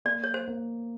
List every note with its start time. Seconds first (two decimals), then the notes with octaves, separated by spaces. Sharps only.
0.05 A#3 D5
0.24 C#5
0.34 C5
0.48 A#3